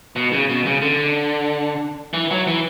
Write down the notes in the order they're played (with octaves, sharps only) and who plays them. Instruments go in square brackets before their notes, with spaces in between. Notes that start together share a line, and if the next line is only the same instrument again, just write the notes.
[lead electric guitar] B2
C#3
B2
C#3
D3
E3
F#3
E3